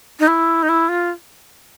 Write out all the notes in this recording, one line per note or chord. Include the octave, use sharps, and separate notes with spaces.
D#4
E4
D#4
E4
F4